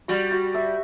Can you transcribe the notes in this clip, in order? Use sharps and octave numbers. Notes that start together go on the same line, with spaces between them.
G3 F#4
F#4
E5